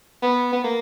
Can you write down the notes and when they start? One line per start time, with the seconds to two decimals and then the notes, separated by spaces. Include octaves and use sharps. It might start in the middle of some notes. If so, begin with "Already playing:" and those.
0.23 B3
0.53 B3
0.64 A#3